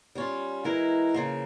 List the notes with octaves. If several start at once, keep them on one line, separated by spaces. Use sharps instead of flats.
G3 C#4 F4
E3 G#3 E4 A#4
C#3 F3 A#3